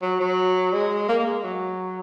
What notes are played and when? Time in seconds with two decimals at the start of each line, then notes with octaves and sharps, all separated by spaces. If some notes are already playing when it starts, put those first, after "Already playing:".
0.02 F#3
0.20 F#3
0.73 G#3
1.09 A#3
1.20 A#3
1.26 G#3
1.43 F#3